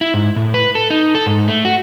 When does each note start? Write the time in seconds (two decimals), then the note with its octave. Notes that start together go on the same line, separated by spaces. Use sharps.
0.01 E4
0.14 G#2
0.36 A2
0.54 B4
0.75 A4
0.90 D#4
1.15 A4
1.26 G#2
1.48 A3
1.65 F#4